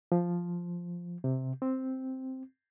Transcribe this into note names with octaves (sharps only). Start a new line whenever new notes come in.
F3
C3
C4